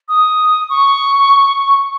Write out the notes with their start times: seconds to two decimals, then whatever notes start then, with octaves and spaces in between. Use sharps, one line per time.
0.08 D#6
0.70 C#6